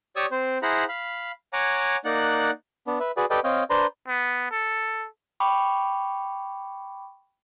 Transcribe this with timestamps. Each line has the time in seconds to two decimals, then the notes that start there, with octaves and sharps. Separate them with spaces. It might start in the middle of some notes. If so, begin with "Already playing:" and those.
0.16 G4 C#5 D5 C#6 D#6 E6
0.31 C4 C5
0.62 E4 G#4 C5 F#5 A#5 B5
0.89 F5 B5
1.53 C#5 F#5 G#5 A#5 D6
2.05 A#3 D#4 D5 F#5 F#6
2.87 B3 D4
3.00 B4 E5
3.17 F#4 G#4 B4 D5
3.30 G4 A4 B4 D5 D#5 G5
3.44 C4 C#5 D#5 F5 G5 F6
3.70 D4 B4 C5 D5 A#5 C6
4.08 B3
4.51 A4
5.40 G5 B5 C#6 D6